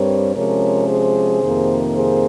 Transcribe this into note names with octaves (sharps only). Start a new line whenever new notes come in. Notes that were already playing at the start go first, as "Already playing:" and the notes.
Already playing: G2 G3 C4 A#4 C#5
C3 F3 G#3 C#4 A#4 C#5
G#4 C5
F2 C3 D#3 A#3
G#4 C5